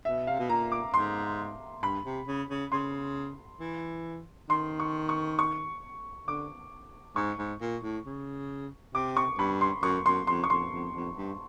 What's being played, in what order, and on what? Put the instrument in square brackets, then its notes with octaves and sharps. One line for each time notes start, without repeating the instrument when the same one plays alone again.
[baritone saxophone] B2 [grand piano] E5
[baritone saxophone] C3 [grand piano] F5
[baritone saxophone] B2
[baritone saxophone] A#2 [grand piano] A#5
[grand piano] D6
[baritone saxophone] G#2 [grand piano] C6
[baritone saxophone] G2 [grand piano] B5
[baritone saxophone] C3
C#3
C#3
[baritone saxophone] C#3 [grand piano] C6
[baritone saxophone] E3
[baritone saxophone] D#3 [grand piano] C6
[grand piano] C#6
C#6
C#6
[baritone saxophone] D3 [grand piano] D6
[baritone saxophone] G#2 [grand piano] C#6
[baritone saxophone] G#2
A#2
A2
C#3
[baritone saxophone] C3 [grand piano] D6
[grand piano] C#6
[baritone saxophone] G2 [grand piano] B5
[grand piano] C6
[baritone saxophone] F#2 [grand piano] C#6
[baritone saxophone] F#2 [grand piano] C6
[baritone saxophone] F2 [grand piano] C6
[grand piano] C#6
[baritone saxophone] F2 [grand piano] C6
[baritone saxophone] F2
F2
G2